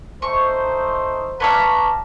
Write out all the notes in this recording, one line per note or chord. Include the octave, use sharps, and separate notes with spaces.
A3 D#4 C5 C#6
B4 C#5 D5 E5 F5 A5 A#5